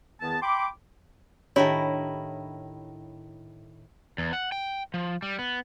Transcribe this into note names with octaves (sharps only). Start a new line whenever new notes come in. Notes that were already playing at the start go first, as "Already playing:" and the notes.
E2 D#3 B3 G#4 A5
G5 B5 C6 D6
A2 D#3 D4 E4 G4 C#5
E2
F#5
G5
F3
G3
B3